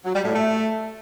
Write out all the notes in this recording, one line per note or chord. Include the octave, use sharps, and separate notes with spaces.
F#3
G3
A2
A3